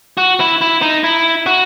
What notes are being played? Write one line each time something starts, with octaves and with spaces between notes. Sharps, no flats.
F#4
E4
E4
D#4
E4
F#4